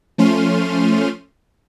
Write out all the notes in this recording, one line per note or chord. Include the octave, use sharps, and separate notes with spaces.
F3 A3 C#4 C6 F6 D#7